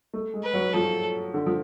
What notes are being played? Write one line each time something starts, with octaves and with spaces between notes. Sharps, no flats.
A3
G#3
B4
F#3
F3 A4
D3
F3